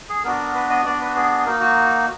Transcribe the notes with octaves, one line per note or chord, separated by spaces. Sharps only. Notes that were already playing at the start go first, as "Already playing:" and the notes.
G#4
B3 D4 F#4 A#4
B4
D#5
B3 D4 F#4 D5
B4
G#4
G#4
A#3 D#4 F#4 A#4
F#4